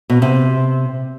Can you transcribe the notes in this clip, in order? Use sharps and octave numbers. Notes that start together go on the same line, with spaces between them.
B2
C3